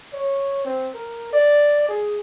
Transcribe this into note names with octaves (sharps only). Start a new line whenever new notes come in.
C#5
C4
A#4
D5
G#4